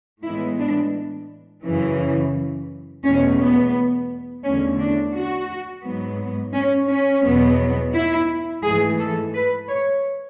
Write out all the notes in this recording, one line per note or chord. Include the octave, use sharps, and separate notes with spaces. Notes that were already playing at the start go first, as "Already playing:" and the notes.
A2 E3 G#3 B3 E4
D4
F#2 C#3 E3
E2 B2 A3 C#4
B3
E2 D3 A3 C#4
D4
F#4
G#2 F#3 B3
C#4
C#4
E2 B2 F#3 B3
E4
G#2 E3 A3 G#4
A4
B4
C#5